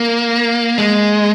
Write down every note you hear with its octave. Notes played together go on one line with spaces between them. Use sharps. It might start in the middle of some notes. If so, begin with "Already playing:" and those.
Already playing: A#3
G#3